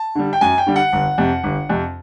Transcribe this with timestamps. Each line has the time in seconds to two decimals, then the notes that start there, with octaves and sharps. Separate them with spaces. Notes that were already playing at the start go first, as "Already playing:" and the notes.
Already playing: A5
0.15 D3 G3
0.33 G5
0.41 F#2 G#5
0.58 G5
0.67 D3 G3
0.76 F#5
0.93 G1
1.18 F2 C3
1.43 G1
1.69 F2 C3